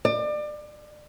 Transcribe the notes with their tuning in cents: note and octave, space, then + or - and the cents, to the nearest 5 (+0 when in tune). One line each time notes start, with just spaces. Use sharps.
D5 +30